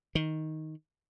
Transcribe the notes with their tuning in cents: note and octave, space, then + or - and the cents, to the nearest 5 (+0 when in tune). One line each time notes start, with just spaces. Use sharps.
D#3 +10